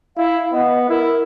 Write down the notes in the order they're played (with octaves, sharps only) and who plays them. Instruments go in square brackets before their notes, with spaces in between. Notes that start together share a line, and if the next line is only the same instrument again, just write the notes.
[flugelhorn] E4 [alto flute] F5
[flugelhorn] B3 [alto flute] D#5
[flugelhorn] E4 [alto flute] A#4